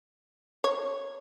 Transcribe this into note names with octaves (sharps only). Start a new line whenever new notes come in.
C#5